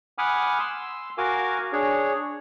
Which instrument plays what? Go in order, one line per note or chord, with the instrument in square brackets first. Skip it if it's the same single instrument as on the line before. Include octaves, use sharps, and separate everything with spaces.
[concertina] F#5 G#5 B5 D6 D#6 F6
C6 E6
F#4 A#4 F5 G#5 D6
D4 G#4 C#5